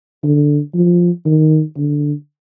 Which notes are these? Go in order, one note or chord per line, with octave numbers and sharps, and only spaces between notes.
D3
F3
D#3
D3